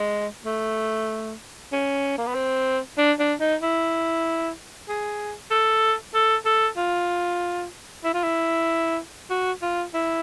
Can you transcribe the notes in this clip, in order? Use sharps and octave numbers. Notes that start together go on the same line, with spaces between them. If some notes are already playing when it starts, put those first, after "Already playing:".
Already playing: G#3
A3
C#4
A#3
B3
C4
D4
D4
D#4
E4
G#4
A4
A4
A4
F4
E4
F4
E4
F#4
F4
E4